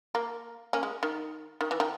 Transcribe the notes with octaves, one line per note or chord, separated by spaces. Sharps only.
A#3
A#3 C#4
G#3
D#3
D#3
E3
D#3